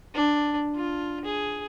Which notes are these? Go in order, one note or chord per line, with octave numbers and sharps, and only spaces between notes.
D4
F4
G#4